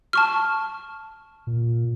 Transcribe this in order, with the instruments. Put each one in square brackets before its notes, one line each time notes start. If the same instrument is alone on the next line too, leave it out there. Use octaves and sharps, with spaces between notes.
[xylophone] A5 C#6 F6
[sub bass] A#2